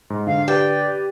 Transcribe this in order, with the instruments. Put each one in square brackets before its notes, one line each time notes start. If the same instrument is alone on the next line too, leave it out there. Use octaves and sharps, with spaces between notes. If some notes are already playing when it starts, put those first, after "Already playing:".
[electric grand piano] G#2
[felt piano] D3 [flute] F5
[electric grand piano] G4 B4 [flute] D5 [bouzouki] G5